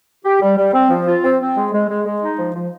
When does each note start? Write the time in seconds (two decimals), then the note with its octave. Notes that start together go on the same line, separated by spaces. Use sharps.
0.24 G4
0.41 G3
0.57 G3
0.73 C4
0.90 F3
1.07 F4
1.24 C4
1.40 C4
1.56 G#3
1.73 G#3
1.89 G#3
2.06 G#3
2.22 D#4
2.39 F3
2.55 F3